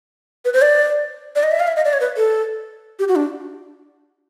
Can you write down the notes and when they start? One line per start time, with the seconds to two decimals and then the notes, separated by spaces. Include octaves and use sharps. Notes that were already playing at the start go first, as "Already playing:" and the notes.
0.45 B4
0.53 C5
0.62 D5
1.35 D5
1.43 D#5
1.52 E5
1.60 F5
1.68 E5
1.76 D#5
1.85 D5
1.93 C#5
2.00 B4
2.17 A4
2.99 G4
3.08 F#4
3.16 D4